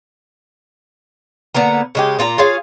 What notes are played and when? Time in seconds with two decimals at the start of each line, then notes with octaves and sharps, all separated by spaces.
1.55 D3 A#3 B3 A#5
1.95 C#3 G#3 G4
2.19 A#2 F4 G#4 A#5
2.38 F4 G#4 C#5 F5